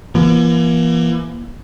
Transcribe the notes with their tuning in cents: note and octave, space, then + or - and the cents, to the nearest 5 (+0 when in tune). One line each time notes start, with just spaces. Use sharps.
E3 +35 A#3 +40